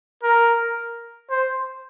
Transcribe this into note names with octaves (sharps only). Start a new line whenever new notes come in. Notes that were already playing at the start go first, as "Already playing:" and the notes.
A#4
C5